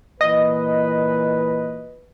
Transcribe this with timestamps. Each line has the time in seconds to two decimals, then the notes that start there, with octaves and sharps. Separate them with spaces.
0.21 A#2 E3 B4 D#5